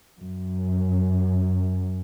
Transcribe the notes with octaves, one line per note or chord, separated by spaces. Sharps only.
F#2